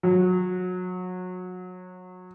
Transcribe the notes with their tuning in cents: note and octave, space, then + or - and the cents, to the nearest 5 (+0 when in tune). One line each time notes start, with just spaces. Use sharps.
F#3 -25